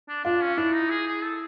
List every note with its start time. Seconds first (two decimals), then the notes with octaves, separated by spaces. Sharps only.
0.09 D4
0.25 D4 F4
0.42 C#4
0.57 D4 E4
0.74 D#4
0.90 G#4
1.07 G#4
1.23 A4